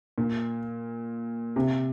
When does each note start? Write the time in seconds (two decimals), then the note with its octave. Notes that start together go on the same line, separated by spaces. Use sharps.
0.18 A#2
1.56 C3